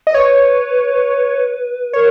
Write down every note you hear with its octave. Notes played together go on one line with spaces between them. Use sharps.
D#5
B4 C#5
A#4 C#5